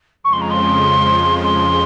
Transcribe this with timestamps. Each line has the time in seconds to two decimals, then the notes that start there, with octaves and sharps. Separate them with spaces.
0.23 F2 C#3 F3 G#3 C#6
0.32 C6
0.41 A#5
0.50 C6
1.43 C6